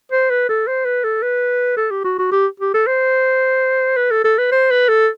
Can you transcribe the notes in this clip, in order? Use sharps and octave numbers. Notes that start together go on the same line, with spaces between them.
C5
B4
A4
C5
B4
A4
B4
A4
G4
F#4
F#4
G4
G4
A4
C5
B4
A4
A4
B4
C5
B4
A4